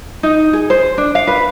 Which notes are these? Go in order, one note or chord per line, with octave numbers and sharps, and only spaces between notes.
D#4
G#4
C5
D4
F5
B4